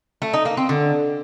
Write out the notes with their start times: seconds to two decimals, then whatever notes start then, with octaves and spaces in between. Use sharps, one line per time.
0.22 A3
0.33 D#4
0.45 A#3
0.57 C4
0.69 D3